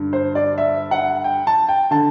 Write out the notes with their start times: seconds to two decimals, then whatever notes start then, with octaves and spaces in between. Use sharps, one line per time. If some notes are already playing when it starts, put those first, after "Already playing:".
Already playing: G2 D3
0.13 C5
0.35 D5
0.58 E5
0.91 F#5
1.24 G5
1.47 A5
1.69 G5
1.91 D3 A5